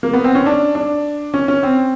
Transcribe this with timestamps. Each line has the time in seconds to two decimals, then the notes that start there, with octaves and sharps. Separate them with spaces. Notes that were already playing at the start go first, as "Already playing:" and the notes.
0.03 A#3
0.13 B3
0.24 C4
0.35 C#4
0.46 D4
0.75 D4
1.34 C#4
1.48 C#4
1.63 C4